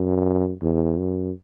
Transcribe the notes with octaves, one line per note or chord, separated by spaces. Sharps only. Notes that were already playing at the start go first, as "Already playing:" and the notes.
Already playing: F#2
E2
F#2